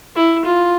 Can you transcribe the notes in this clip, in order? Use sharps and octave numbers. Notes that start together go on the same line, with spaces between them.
E4
F4